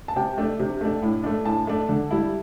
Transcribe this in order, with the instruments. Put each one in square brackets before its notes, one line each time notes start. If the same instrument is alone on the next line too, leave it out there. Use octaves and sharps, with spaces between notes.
[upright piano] A5
C3 G5
A3 D4
C3
A3 D4
A2
A3 D4
A2 A5
A3 D4
D3
G3 E4